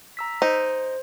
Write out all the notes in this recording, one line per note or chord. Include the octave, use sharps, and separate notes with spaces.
A#5 E6 B6
D#4 C5